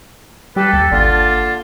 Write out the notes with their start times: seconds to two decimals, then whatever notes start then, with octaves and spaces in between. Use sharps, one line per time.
0.56 G3 G4 A4 B4
0.73 D#2 A5
0.91 G#1 D3 A#3 F4